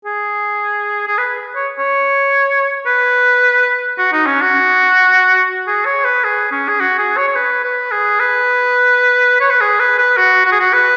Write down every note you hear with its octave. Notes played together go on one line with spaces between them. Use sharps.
G#4
G#4
B4
C#5
C#5
B4
F#4
D#4
C#4
F#4
G#4
C#5
B4
G#4
C#4
G#4
F#4
G#4
C#5
C#5
B4
B4
G#4
B4
C#5
B4
G#4
B4
B4
F#4
F#4
G#4
F#4
B4